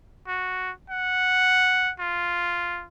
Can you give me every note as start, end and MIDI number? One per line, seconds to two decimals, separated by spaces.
0.28 0.71 66
0.90 1.92 78
1.99 2.86 65